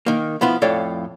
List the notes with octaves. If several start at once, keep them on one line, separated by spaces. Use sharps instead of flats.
D#3 A#3
F3 B3 E4 F4
F2 A2 A4 C#5 D5 F5